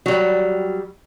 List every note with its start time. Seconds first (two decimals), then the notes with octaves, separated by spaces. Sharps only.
0.06 F#3 G3